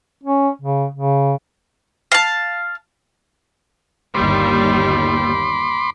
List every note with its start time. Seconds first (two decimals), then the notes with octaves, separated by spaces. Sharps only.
0.24 C#4
0.62 C#3
0.93 C#3
2.12 F5 A5
4.15 G1 D#2 G3 B5 C6 D6